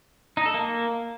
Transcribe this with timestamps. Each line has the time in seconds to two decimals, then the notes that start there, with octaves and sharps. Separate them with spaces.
0.37 D#4
0.46 A4
0.54 A#3